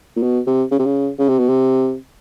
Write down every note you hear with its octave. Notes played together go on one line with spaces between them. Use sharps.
A#2
B2
C3
C#3
C3
C#3
C#3
C3
B2
C3